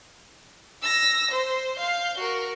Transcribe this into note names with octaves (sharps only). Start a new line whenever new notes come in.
E6 A#6
C5
F5 G6
F#4 A#4